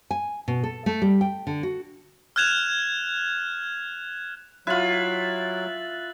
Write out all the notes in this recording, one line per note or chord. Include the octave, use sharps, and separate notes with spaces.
G#5
B2
A4
A3
G3
G5
D3
F#4
F6 F#6 G#6 E7 F7
F#3 E4 F4 F#6 A6 F#7